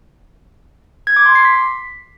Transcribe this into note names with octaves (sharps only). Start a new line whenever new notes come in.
G#6
D6
C6
C7
B6